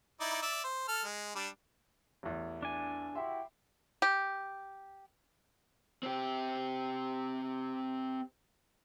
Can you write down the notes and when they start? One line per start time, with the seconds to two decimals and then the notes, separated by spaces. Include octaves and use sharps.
0.20 D#4 E4 D5
0.42 D5 E5
0.64 C5
0.88 A4 F6
1.04 G#3
1.35 G3 D4
2.23 A1 E2
2.63 D4 G#5
3.15 E4 F#4 G4 E5 C6
4.02 G4
6.03 C4 G4